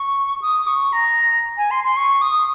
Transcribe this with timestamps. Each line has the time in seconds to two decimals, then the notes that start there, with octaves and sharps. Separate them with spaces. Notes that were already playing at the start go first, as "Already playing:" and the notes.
Already playing: C#6
0.42 D#6
0.67 C#6
0.93 A#5
1.58 G#5
1.71 C6
1.84 C6
1.97 C#6
2.22 D#6